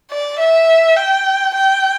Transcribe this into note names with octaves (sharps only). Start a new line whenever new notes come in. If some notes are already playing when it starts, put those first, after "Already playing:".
D5
E5
G5
G5